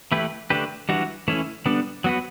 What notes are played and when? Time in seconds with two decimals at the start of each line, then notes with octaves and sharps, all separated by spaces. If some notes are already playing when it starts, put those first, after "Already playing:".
0.12 E3 A3 E4 G4 B4
0.50 D3 A3 D4 G4 B4
0.89 E3 G3 D4 F#4
1.28 E3 A3 C#4 E4
1.66 D3 G3 B3 D4
2.04 F#3 B3 F#4 B4